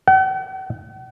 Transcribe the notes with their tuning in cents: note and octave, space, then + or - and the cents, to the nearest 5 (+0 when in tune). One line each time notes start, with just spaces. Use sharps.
F#5 +45